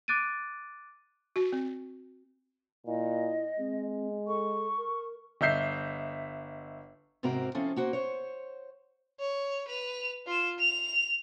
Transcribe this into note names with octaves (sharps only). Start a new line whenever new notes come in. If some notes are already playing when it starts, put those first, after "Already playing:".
D6 F#6 A6 D7 D#7
F#4
C4
A#2 E4 D#5
G#3 C4
A4 C#6
A#4
G1 D#5 E5 G6 C7
G#2 C3 C4 F#4 A#4 A#5
F3 C4 C#4 E4 F4 A4
A#3 F#4 C5
C5 C#5
C#5
B4 F7
F4 E7
F7